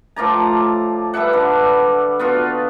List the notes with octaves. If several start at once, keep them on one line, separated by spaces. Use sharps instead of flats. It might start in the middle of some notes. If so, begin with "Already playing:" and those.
A2 F3 D5 A#5
G3 B4 E5 F#5
D3 B4
B3 F4 F#4